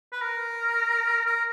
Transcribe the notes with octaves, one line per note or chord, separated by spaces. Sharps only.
B4
A#4
A#4